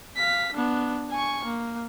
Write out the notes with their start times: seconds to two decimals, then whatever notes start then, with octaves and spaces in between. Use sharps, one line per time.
0.17 F5 B6
0.54 B3 D4
1.11 G#5 C#6
1.45 A#3